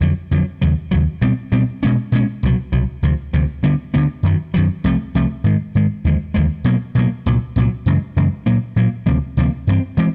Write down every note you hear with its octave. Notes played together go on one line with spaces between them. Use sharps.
F2 D3 F#3
F2 D3 F#3
D#2 C#3 F#3
D#2 C#3 F#3
B2 G3 C4
B2 G3 C4
B2 G#3 C#4
B2 G#3 C#4
C2 B2 F#3
C2 B2 F#3
D2 C3 F3
D2 C3 F3
D2 D3 G3 B3
D2 D3 G3 B3
F#2 D#3 F#3
F#2 D#3 F#3
C2 C3 F3 A3
C2 C3 F3 A3
G#2 D#3 G#3
G#2 D#3 G#3
D#2 D3 F3 G#3
D#2 D3 F3 G#3
B2 F#3 A#3
B2 F#3 A#3
C2 A#2 F#3
C2 A#2 F#3
F#2 C#3 E3 G#3
F#2 C#3 E3 G#3
A#2 F#3 A#3
A#2 F#3 A#3
D2 C3 F3 A#3
D2 C3 F3 A#3
G2 E3 G#3 C4
E3 G#3 C4